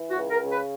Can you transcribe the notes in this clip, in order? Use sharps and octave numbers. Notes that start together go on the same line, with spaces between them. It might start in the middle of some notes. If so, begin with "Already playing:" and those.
Already playing: E3
F#4
C#2
A#4
C#3
B4